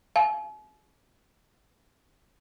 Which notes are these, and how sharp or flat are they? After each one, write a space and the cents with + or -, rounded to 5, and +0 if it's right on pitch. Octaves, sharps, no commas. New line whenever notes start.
F5 -25 G#5 +45